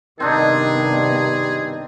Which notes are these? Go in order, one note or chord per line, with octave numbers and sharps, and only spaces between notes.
G2 C3 D#3 B3 C4 D4 D#4 G#4